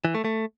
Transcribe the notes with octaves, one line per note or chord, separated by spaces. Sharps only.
E3
A3
A3